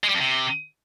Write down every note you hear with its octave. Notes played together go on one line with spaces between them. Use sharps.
G#3
G3
F2
C3